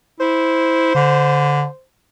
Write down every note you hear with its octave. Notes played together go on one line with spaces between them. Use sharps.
E4 C5
D3